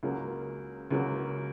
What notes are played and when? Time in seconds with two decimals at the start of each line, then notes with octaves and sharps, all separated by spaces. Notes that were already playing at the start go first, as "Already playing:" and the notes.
0.03 C#2 C#3 F#3 A#3
0.91 C#2 C#3 F#3 A#3